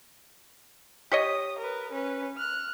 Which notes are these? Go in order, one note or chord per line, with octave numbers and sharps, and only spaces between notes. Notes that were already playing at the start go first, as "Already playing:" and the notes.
G4 C#5 D#5 D#6
A#4 B4
C#4 B4
F6 F#6